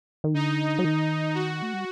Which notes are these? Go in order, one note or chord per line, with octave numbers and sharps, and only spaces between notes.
D#3
D3 D#4
F#3
D#3
F#4
A3
G3